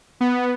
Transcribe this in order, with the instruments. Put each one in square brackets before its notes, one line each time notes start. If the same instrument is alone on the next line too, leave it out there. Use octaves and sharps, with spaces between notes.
[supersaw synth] B3